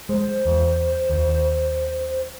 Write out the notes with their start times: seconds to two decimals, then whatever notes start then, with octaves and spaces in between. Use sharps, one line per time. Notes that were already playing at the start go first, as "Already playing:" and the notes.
0.09 G#3 C5
0.45 E2
1.10 D#2